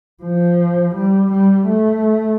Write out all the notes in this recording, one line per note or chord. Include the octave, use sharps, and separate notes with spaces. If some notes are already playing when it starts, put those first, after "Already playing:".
F3
G3
G3
A3